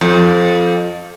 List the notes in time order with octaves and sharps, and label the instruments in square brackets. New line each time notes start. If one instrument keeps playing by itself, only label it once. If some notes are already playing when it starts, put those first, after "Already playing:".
[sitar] F2